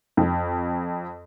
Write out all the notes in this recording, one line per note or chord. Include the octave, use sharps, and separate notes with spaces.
F2